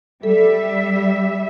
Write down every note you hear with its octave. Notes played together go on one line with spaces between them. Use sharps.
G3 A4 E5